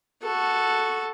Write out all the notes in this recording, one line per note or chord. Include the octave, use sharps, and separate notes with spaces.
F#4 A4